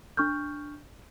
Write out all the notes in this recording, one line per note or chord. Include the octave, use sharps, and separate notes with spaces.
D4 C#6 F6 G6